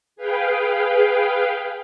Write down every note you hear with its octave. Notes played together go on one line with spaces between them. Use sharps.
G#4 B4 F5 G5